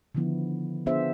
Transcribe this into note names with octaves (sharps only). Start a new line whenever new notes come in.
D3 D#3 F3 B3 E4
B3 D4 F4 G#4 C5 E5